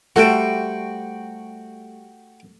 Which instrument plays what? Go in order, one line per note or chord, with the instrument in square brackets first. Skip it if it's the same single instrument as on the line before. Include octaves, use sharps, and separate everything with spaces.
[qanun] G3 A3 C5 [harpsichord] F#4 G5 [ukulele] A4 F#5